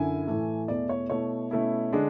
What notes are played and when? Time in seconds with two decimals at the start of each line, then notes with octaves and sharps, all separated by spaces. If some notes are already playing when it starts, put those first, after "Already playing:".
Already playing: F#2 D3 E4 G#5
0.27 A2 E3 A3
0.68 E2 B2 A3 E4 D5
0.89 C#5
1.10 B2 A3 E4 C#5
1.51 B2 A3 C#4 E4
1.93 D3 G#3 D4